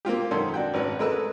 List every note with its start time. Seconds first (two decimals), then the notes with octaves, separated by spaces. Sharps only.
0.05 A#3 C4 F4 G4
0.31 F#2 D#3 C4 C#4 A4 C5
0.54 D4 F#4 G5
0.74 G#1 C#4 B4
0.99 G#3 A3 A#4 B4 E6 F#6